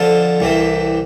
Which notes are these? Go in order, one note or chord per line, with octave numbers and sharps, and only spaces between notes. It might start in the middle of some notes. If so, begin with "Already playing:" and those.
Already playing: F2 D3 F3 F4 A4
C2 C3 E3